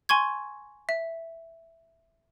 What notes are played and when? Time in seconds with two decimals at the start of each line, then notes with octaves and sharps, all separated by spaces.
0.09 G#5 C6 C#6 G#6
0.89 E5